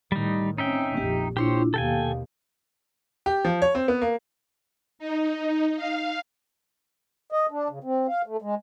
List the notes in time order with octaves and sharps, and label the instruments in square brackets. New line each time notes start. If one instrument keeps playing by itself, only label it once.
[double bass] A2 D#3 [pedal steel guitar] G3 D#4
[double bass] C4 C#4 [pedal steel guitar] D#4 E5 G5
[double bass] A#1 F2 [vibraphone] G4
[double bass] A#2 [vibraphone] D4 E4 F4 [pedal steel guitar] G4 C5 C#5
[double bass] D#2 B2 [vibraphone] G4 F5 [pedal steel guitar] A4 G5 G#5
[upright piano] G4
F3
C#5
C4
B3
A#3
[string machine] D#4
F5
[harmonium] D#5
D4
C#3
C4
F5
A3
G#3